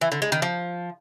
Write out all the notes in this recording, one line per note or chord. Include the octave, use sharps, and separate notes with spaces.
E3
D3
G#3
D#3
F3